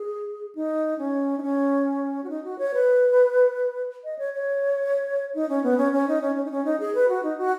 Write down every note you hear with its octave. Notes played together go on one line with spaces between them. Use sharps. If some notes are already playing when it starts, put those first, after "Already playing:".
Already playing: G#4
D#4
C#4
D#4
C#4
F#4
D#4
F#4
C#5
B4
D#5
C#5
C#5
D#4
C#4
B3
C#4
C#4
D#4
C#4
C#4
D#4
C#4
D#4
G#4
B4
F#4
D#4
F#4